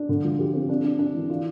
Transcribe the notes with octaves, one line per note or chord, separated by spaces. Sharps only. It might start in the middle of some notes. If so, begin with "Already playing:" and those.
Already playing: D4
D3
F3
G4
C4
D4
D4
D4
E3
F4